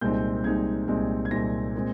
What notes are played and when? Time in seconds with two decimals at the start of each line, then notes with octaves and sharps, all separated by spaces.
0.01 C2 A#2 G#3 C4 D#4 G6
0.44 C2 A#2 G#3 C4 D#4 G#6
0.88 C2 A#2 G#3 C4 D#4
1.25 G#6
1.31 C2 A#2 G#3 C4 D#4 A#6
1.75 A#2 G#3 C4